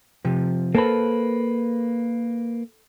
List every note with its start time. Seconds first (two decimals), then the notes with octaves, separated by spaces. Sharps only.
0.25 C3 F3
0.75 A#3 A4 B4 C5 A5